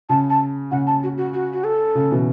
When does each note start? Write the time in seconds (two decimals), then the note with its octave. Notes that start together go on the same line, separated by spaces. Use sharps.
0.09 C#3 A5
0.30 A5
0.71 C#3 F#5
0.87 A5
1.03 F#4
1.17 F#4
1.34 F#4
1.53 F#4
1.64 A4
1.95 C#3
2.11 B2 E3